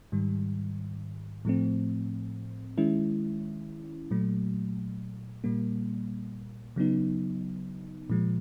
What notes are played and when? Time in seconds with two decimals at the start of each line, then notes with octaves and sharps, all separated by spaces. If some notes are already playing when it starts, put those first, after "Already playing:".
0.12 G#2 D#3 G3
1.45 A2 F3 A3 C4
2.78 D#3 G#3 C#4 E4
4.11 A#2 F#3 A3
5.44 A#2 G3 A#3
6.76 C#3 F#3 B3 D#4
8.10 A#2 F3 G#3